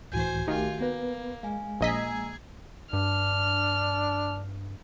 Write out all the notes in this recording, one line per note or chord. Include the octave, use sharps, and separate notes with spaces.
C#2 A2 E3 F#4 C5 G#5 G6
B1 D#3 A3 F4 G4 G#5
A#3 B3 B4
G#3 F5 G#5
A#1 A#3 G#4 D#5 G#5 A#5 E6 B6
G2 D4 F6